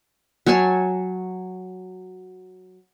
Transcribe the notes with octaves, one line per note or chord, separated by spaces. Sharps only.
F#3 C#5 G#5 A5